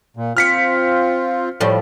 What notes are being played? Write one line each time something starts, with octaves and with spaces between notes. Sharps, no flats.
A#2
C4 F4 F6 B6 C#7
A2 F3 G3